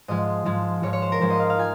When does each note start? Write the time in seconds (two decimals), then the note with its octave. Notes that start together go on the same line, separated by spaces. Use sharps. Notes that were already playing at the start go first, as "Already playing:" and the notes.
0.08 G#2 F3 G#3 D#5
0.45 G#2 F3 G#3
0.83 G#2 F3 G#3 C#5
0.93 C#5
1.02 C5
1.12 A#4
1.21 G#2 F3 G#3 C5
1.30 D#5
1.40 F5
1.50 F5
1.59 F4 G#5